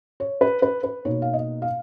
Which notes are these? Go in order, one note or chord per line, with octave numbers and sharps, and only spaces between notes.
C#5
B4
B4
B4
B2 A#3 D#4 C#5
F5
D#5
F5